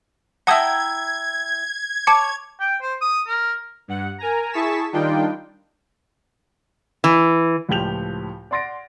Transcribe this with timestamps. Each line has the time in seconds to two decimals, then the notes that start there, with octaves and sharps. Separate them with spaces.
0.47 E4 F#5 G5 A5 A#5 D#6 G#6
2.07 C#5 A5 D6 C#7
2.60 G5
2.82 C5
3.01 D#6
3.27 A#4
3.88 G2 F#5
4.18 A#4 G#5 A#5
4.53 E4 G#4 A5 C#6 B6 E7
4.93 D#3 G3 D4 D#4 F4 G5
7.04 E3
7.69 C#2 A2 F3 G4 G6 F7
8.51 D5 F#5 C6 A6 A#6 D7